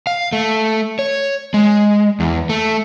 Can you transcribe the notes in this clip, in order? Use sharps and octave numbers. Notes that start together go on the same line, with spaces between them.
F5
A3
C#5
G#3
E2
A3